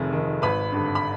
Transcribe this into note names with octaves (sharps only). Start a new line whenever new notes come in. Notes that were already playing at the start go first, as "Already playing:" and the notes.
Already playing: F1 F2 D#3 G#4
F2 D#3
G#1 B4 B5
G2 D3
B5